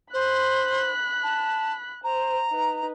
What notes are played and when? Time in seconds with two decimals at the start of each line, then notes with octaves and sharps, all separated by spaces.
0.13 C5 B5 F#6
1.23 A5
2.04 C5 A#5
2.50 D#4 B4